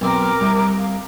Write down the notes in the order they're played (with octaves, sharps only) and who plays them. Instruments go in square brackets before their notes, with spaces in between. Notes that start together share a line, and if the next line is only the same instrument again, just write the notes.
[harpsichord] B1 C4 [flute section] A#4 D6
[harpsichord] C2
[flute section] F5